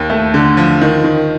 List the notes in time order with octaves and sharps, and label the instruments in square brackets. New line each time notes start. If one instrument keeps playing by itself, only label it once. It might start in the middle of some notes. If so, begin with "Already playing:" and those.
Already playing: [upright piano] D#2
A3
D3
F3
D#3
D#3